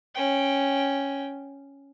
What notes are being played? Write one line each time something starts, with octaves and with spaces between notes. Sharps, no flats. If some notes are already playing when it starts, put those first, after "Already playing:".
C#4 G5